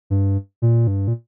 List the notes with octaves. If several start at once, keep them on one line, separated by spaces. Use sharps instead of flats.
G2
A#2
G2
A#2